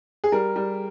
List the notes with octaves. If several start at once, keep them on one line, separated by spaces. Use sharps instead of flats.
G#4
G3 A#4
G3